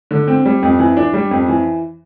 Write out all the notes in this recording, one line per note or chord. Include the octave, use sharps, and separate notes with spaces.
D3
C4
G3
F2
E3
D4
G3
F2
E3